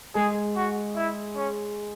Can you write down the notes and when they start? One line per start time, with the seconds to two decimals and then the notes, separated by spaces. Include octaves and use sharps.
0.15 G#3 G#4
0.56 F#4
0.96 E4
1.36 C#4